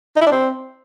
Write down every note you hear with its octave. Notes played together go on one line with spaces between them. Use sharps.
D#4
E4
D4
C4